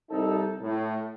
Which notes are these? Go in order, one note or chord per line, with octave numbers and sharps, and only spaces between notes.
C2 D#4 A4
A2